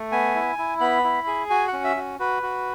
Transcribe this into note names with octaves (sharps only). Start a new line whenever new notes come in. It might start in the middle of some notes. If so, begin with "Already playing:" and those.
Already playing: A3
B3 G#5
E4
E4
B3 B5
E4
G#4
F#4 G#5
F#5
C#4
E5
F#4
F#4 B4
F#4